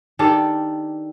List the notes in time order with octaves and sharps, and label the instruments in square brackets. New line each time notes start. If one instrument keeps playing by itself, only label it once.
[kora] D#3 D4 G4 A4